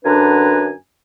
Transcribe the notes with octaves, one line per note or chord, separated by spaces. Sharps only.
F#2 D3 D4 B4 G#5 A#5